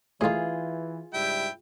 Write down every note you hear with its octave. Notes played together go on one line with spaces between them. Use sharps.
A2 D#3 E3 F4 G#4
G#2 C#3 G3 E4 G5